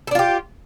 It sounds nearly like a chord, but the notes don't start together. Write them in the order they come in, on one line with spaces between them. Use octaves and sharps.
A4 D4 F4 G4